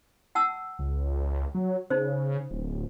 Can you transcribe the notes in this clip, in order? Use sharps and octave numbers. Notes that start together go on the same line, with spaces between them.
F#5 A5 E6
C#2
F#3
C#3 D#4 C5
D1